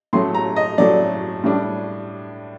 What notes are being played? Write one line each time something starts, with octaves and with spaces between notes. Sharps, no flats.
A2 F#3 A3 C6
A#5
D#5
A2 F#3 A3 D5
A2 G3 D4